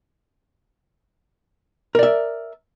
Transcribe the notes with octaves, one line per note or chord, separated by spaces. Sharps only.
A#4 D5 E5